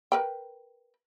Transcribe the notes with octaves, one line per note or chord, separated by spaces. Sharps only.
A#4 B4 G5